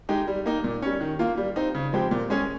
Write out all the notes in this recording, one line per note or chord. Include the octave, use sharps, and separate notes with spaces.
G#3 D#4 G4
G3
A#3 D#4
A#2
G3 C#4
D#3
A#3 F4
G3
C4 D#4
C#3
F3 G#3 C4 G4
A#2
G#3 C#4 G#4